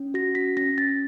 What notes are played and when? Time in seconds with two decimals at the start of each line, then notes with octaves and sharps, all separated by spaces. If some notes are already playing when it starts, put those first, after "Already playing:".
Already playing: C#4
0.14 F#4 A#6
0.35 C#4 B6
0.57 C#4 A#6
0.78 C#4 A6